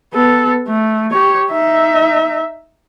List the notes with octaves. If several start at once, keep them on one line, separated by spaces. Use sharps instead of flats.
B3 A4
A3
G4 C#5
D#4 E5